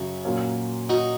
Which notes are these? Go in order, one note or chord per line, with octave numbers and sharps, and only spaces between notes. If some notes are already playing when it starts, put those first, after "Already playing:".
Already playing: F#2 C#3 F#4
A#2 F#3 A#3 C#4
D#4 F#4